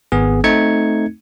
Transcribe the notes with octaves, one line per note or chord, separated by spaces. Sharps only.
G#1 B3 G#4
A3 C4 D#4 G#6 C#7